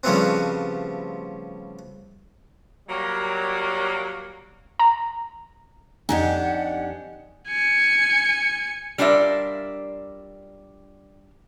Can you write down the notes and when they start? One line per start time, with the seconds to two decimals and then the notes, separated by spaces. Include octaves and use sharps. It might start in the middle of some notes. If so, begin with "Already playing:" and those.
0.04 C#3 F3 G3 A3 B3 C4
2.88 F#3 G3 A#3
4.79 A#5
6.09 F2 D4 D#4 G4 D#5 F#5 G#5
7.49 G#5 C#7
8.98 G3 D4 F4 A#4 D5 E5